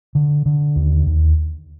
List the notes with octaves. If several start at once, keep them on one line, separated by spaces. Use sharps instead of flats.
D3
D3
D#2
D#2